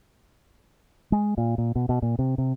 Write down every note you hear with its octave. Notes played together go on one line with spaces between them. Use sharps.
G#3
A#2
A#2
B2
B2
A#2
C3
C3